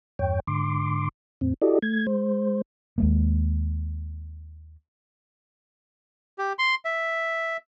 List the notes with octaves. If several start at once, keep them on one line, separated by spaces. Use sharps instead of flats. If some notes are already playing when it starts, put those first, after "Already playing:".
E2 G2 C#5 G5
G#2 D3 C6 D6
E2 A2 C4
E4 F#4 G4 A4 D5 D#5
A3 G#6
G#3 C5
D#2 G#3 A#3
G4
C6
E5